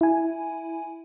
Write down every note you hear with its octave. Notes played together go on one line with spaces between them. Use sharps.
E4 G#5